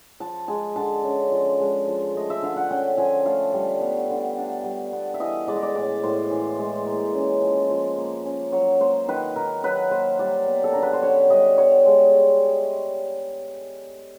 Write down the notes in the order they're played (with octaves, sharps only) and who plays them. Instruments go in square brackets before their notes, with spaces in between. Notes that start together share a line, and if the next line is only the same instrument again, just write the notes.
[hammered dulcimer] F3 A5
G#3 G#5
D3 A5
C#4
F3
G#3
F3
A3 D#5
E5
D3 F5
F#5
C#4 G5
F3 G#5
A3 F5
G3
B3
D3
D4
G3
B3
E5
E3 D#5
G#3 D5
D#5
D5
A2 D5
A2 C5
E3
G#3
A#3
C#4
F3
F3
A#3
C#4
F#3 C#5
A#3 C5
D#3 B4
D#3 A#4
F#3 B4
A#3 C5
G3 D5
B3
A4
D3 A#4
B4
C5
D3 C#5
G3 D#5
B3 C#5
G#3